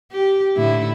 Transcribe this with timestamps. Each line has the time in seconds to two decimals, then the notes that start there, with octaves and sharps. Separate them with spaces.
0.12 G4
0.56 A2 D3 E4